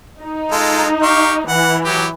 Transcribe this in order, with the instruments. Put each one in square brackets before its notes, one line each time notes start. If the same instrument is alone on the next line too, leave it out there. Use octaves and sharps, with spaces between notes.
[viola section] D#4
[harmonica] G#3 F4 A4
G4 F5 C#6
[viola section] E3 [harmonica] F#5
[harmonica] F#3 G4